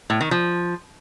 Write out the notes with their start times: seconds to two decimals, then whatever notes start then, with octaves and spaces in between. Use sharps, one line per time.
0.10 A2
0.21 D#3
0.31 F3